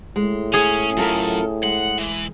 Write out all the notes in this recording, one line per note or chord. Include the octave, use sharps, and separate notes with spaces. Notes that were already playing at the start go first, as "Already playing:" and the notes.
A2 G#3
C#4 G#4
F#2 F4 A4 A#4
G#3 F#5
E3